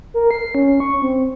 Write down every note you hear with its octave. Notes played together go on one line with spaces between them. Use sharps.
A#4
C7
C#4
C#6
C4